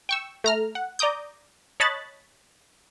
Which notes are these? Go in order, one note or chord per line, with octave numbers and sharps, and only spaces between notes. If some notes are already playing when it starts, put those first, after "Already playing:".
G5 C#6 E6
A3 A#5 F6
F#5
D5 A#5 D6 D#6 G6
C#5 D#5 A5 B5 F#6 A6